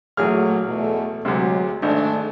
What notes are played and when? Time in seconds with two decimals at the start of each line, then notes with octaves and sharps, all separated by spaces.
0.17 A1 A#2 F#3 A3 G#4 F6
0.66 E2 B2 A3
1.25 D2 C3 F#3 G#3
1.82 G#1 G#3 A3 D4